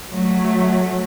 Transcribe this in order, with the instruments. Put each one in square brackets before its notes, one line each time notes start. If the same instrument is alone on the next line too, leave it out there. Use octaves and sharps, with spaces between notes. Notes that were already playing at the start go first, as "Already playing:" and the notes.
[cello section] F#3 A3